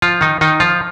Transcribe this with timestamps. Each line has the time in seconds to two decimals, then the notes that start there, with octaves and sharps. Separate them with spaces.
0.02 F3 F4
0.21 D#3 D#4
0.41 D#3 D#4
0.60 F3 F4